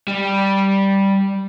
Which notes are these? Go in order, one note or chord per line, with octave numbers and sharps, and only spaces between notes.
G3